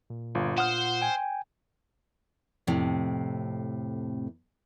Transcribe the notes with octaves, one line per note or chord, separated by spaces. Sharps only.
A#2
G1 F4
C5 F#5 D#6 F6
G5 G#5
F2 A2 C3